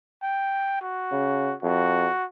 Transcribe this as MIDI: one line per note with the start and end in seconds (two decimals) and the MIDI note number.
0.23 0.77 79
0.82 1.55 66
1.12 1.53 49
1.63 2.09 41
1.63 2.25 66